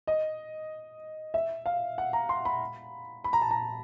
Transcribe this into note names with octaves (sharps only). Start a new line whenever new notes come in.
D#5
E5
F5
F#5
A#5
C6
B5
B5
A#5
A5
A#5